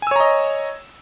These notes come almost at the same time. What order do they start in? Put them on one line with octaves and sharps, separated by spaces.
G#5 E6 C#5 A#5 D#5